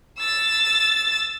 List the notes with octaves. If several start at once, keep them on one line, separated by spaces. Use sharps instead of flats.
E6 A6